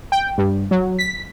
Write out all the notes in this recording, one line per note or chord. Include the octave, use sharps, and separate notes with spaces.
G5
G2
F#3
B6